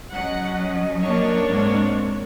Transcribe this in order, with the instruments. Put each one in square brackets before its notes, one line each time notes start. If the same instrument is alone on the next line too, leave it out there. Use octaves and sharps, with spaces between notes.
[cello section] F#3 C#4 D#5 [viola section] F#5
[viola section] A#3 D4 C#5
[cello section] G#2 G#3 C4